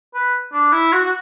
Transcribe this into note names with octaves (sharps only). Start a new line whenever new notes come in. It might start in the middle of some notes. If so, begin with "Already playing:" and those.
B4
D4
E4
F#4
F#4